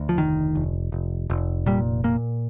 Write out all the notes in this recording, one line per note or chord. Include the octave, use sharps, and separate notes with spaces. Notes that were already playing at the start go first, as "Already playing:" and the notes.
Already playing: D2
F3
F1 D#3
F1
F1
F1
A#2 G3
A#2 A#3